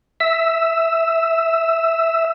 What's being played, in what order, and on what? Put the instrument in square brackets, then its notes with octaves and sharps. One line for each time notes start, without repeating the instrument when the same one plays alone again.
[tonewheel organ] E5 E6